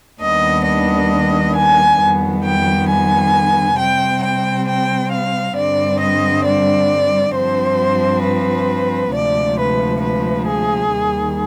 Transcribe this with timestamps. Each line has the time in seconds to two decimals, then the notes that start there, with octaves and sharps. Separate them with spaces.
0.21 D#2 D#3 G3 B3 D4 D#5
0.66 D#5
1.55 G#5
2.00 F2 D#3 G3 B3
2.43 G5
2.88 G#5
3.77 C3 G3 C4 G5
4.22 G5
4.67 G5
5.11 F5
5.56 G2 D3 G3 C4 D5
6.01 D#5
6.45 D5
7.34 G2 F3 C4 C5
8.23 B4
9.13 D2 C3 F3 G#3 D5
9.58 B4
10.01 B4
10.47 G#4
10.90 D#2 D#3 G3